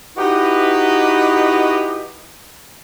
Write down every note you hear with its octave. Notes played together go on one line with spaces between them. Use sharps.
D#4 E4 F#4 G4 B4 D#5